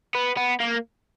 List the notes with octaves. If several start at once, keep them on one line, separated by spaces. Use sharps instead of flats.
B3
B3
A#3